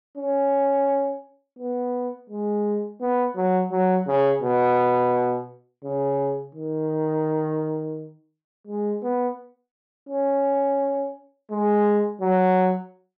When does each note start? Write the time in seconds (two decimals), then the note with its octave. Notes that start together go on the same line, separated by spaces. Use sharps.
0.18 C#4
1.59 B3
2.30 G#3
3.01 B3
3.36 F#3
3.72 F#3
4.07 C#3
4.42 B2
5.84 C#3
6.55 D#3
8.68 G#3
9.03 B3
10.09 C#4
11.51 G#3
12.21 F#3